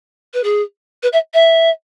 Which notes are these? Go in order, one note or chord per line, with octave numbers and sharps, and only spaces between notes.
B4
G#4
B4
E5
E5